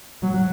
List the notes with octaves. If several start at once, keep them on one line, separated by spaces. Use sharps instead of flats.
F#3